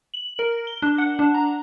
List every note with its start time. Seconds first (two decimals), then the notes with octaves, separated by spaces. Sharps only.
0.14 F#7
0.39 A#4
0.67 G7
0.82 D4
0.98 F#5
1.19 D4
1.34 A#5